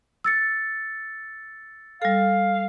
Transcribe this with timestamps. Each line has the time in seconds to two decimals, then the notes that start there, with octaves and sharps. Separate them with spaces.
0.24 E6 A6 C#7
2.02 G3 A4 F5